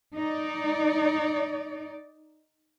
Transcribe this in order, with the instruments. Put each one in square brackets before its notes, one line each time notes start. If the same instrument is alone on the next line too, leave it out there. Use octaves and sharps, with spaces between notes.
[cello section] D#4 D5